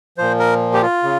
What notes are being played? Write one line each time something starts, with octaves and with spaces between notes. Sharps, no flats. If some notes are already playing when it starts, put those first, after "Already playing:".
A#2 F3 C5
A#4
G4
F4
C#3